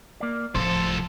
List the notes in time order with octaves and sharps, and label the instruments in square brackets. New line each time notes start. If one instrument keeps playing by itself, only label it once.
[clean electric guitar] A#3 D5
[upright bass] D1 A2 [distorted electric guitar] C2 A4 [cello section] F3 [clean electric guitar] C5